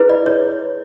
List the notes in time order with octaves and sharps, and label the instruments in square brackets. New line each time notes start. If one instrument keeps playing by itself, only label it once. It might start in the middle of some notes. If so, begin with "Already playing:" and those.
Already playing: [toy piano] E4 G#4 B4
D5
C#5